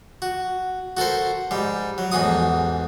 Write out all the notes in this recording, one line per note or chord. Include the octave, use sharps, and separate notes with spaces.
F#4
F#4 A4 A#4 C5
G#2 G3
F#3
A1 E2 G#2 F#4 D#6